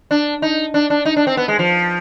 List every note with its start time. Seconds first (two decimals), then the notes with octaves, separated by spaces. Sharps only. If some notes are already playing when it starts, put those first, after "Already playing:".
0.11 D4
0.42 D#4
0.74 D4
0.90 D4
1.05 D#4
1.17 D4
1.27 C4
1.37 B3
1.48 G#3
1.59 F3